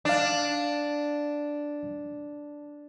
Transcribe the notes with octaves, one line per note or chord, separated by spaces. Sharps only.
D4 D5 F5